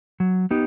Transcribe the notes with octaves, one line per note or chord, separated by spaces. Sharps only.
F#3
B3 D#4 G4